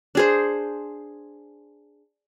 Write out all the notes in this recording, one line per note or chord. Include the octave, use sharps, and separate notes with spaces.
D4 G#4 C5